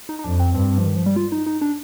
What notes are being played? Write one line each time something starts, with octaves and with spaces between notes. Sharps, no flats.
D#4
D#4
F2 D4
C4
G2 C4
F3
D#3
F3
G3
F4
D#4
D#4
D4